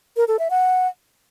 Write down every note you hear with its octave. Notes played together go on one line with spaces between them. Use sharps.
A#4
A4
E5
F#5